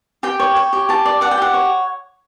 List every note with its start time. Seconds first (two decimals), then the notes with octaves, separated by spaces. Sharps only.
0.23 G4 G5
0.40 C#5
0.56 C#5
0.73 G4
0.89 G4 A5
1.05 D5
1.21 D5 F#5
1.31 G5
1.38 G4 F#5
1.54 C#5